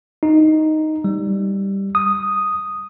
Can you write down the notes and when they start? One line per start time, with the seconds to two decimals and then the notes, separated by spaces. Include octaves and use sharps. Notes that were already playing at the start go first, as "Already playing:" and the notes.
0.23 D#4
1.04 G3
1.95 D#6